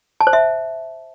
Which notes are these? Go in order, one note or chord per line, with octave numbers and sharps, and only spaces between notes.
A5
C5
E5